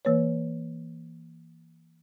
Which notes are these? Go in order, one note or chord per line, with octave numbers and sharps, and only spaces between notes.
E3 A#3 B4 C#5